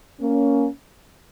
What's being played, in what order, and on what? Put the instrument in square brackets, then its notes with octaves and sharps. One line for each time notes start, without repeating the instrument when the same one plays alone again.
[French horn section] A#3 C#4